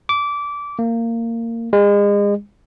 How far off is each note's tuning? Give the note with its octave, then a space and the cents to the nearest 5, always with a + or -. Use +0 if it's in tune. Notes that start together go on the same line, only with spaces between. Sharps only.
D6 -20
A#3 -20
G#3 -35